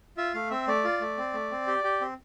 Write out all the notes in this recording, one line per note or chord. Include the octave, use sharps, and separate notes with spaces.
F4 E5
A3 F5
C4 E5
A3 D5
F4
A3
C4
A3
C4
G4
G4
C4